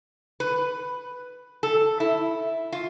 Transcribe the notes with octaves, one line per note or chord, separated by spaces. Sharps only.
B4
A4
E4
F4